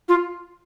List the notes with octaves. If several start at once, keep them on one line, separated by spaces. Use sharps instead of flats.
F4